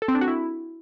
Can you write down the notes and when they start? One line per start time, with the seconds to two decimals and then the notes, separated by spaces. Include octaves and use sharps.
0.02 A4
0.08 C4
0.15 D4
0.21 F#4
0.28 E4